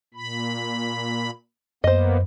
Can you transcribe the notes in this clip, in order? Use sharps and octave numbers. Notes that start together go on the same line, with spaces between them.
A#2 B5
F#2 A#3 B3 C5 D#5